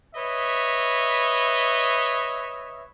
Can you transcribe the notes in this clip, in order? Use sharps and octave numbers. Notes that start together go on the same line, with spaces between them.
B4 C#5 D#5 E5